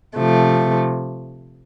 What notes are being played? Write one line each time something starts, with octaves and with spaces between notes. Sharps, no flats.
C3 F3 A3